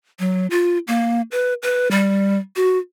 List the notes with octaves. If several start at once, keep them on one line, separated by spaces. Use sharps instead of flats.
F#3
F4
A#3
B4
B4
G3
F#4